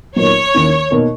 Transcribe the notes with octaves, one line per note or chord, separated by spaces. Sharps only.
A#2 F#3 B3 D#4 A#4 C#5
D#2 D#3 A#3 C#4 E4
B2 A#3 D#4 A#4